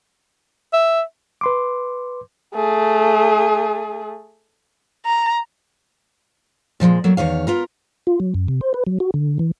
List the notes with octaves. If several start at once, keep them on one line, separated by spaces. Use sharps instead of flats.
E5
B4 C6 D6
A3 G#4
A#5
A#2 F3 F#3 G#3
F#3 A3 A#3
E2 D#3 C#5 F5
B3 F4 A#4
F4
F#3
F#2
C3
C5
B4
F#3
F#4
D3
E3